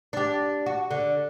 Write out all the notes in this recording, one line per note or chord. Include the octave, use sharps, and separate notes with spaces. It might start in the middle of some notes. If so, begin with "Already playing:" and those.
D4 G4
F#4
D3